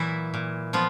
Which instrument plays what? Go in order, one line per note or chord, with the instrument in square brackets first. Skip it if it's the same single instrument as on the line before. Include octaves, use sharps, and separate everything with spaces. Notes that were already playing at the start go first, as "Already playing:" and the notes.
Already playing: [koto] A#2 E3 F#3 E4
A#2
F3 B3 F4